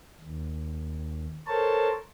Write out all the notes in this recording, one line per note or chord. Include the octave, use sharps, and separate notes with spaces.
D#2
A4 A#4 C5 C#5 A5